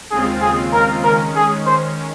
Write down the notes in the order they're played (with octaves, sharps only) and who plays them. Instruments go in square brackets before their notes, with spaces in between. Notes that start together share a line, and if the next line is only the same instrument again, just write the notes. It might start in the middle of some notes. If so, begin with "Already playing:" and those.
[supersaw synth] D#2 C#3 G#3 C4 F4 [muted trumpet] G#4
[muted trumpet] G#4
A#4
[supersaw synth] D#3 G#3 C#4 [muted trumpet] A#4
[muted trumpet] G#4
C5